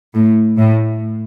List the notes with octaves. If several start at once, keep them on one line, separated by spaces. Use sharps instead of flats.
A2
A2